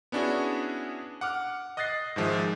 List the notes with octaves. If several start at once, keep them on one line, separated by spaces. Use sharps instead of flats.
B3 C#4 D4 E4 F#4 G#4
F#5 D6 F6
D#5 D#6 F#6 A6 A#6 C7
G#2 D#3 F3 G#3 E5